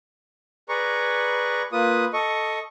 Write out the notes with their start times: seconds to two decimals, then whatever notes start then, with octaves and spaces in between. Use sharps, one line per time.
0.69 G#4 B4 D5 A#5 C#6
1.72 A#3 F4 B4 D#6
2.13 A4 D#5 C#6